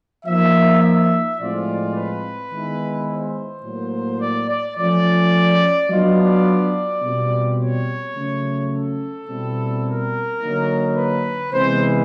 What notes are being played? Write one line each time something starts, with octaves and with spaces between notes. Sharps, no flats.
F3 A#3 D#4 E5
E5
A2 F3 G#3 C4 F4 D5
B4
D#3 G#3 B3 E4
C5
A2 F#3 A#3
D5
D5
F3 A3 C#4 F4 D5
F#3 B3 D4 F4 D#5
D5
B2 G3 C4 F4
C#5
C#3 F#3 A3
A4
B2 G3 C4 E4
A#4
D3 F#3 A#3 D#4
B4
C3 E3 G#3 B3 C5